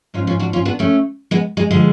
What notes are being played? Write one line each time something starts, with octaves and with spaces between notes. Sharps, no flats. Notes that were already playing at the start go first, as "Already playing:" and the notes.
G#2 F3 C#4 F4
C#4 F4
D4 F#4
C#4 F4
B3 D4
A3 C#4
G#3 B3
G#3
D3 F3 G#3